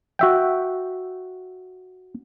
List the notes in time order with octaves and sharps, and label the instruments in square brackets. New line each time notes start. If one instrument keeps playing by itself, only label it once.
[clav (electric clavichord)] F#4 E5 G5